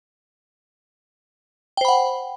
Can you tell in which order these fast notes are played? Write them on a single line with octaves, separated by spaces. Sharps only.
G5 C5 B5 F#5